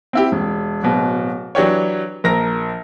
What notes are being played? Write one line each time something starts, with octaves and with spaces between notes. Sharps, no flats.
C4 E4 G4
E1
D1 B2
E3 F#3 D4 G4 C#5
A#1 A#4 F6 A#6